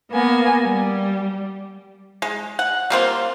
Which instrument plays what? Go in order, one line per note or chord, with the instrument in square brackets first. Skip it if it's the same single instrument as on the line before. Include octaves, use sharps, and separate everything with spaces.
[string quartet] A#3 B3 G#5
G3
[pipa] G#3
F#5
G3 A#3 C4 F4